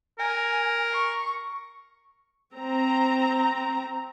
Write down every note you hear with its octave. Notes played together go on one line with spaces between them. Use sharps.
A#4 G#5
C#6
C4 A#5